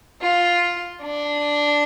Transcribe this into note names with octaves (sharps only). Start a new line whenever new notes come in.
F4
D4